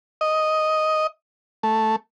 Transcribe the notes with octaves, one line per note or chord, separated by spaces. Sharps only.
D#5
A3